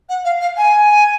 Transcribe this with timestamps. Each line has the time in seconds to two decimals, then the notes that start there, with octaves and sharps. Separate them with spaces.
0.09 F#5
0.25 F5
0.41 F5
0.57 G#5